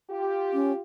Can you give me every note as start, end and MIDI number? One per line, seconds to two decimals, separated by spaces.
0.10 0.82 65
0.10 0.82 67
0.53 0.72 61